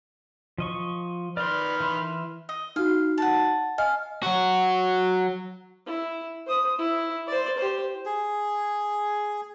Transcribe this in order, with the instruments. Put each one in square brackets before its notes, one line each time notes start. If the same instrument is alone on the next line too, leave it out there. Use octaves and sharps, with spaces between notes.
[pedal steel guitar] F3 D#5 C#6
[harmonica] D#3 B4 F6 [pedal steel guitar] D5 C6
[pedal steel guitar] E3 B5 C6
[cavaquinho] D#5
[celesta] D#4 F#4 [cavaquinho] F5
[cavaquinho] F#5 A5
[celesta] D#5 G#5 [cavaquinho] F5
[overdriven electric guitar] F#3 F#4
[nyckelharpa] E4
C5 D#6
E4
C5 D5
G4 C5
[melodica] G#4